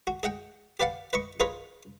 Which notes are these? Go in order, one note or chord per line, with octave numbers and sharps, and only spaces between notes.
F#4
G#4 D#5 F#5 G5
G4 B4 D5 F5 F#5
B4 D#5 C#6
D#4 F4 G#4 A#4 B4 C#5